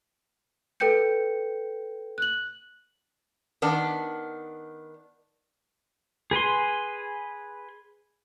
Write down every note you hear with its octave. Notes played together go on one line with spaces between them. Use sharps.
A4 B4 G5 G6 C#7
F#6 F#7
D#3 B3 D4
G#4 B4 G#5 C6